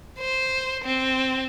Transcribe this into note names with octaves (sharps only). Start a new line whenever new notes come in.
C5
C4